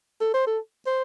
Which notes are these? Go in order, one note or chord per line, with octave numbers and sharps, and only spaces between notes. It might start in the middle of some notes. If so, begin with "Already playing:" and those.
A4
C5
A4
C5